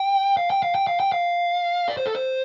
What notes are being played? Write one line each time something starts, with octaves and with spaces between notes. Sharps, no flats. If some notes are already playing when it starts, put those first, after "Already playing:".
Already playing: G5
F5
G5
F5
G5
F5
G5
F5
D5
C5
A4
C5